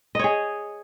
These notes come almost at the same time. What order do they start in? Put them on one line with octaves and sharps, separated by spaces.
D#5 C#5 G#4